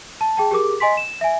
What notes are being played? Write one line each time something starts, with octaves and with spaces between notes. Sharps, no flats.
A5
G#4 G5 A5
G4 G#4 A#4 D6
D#5 G#5 C6 B6
E7
E5 G#5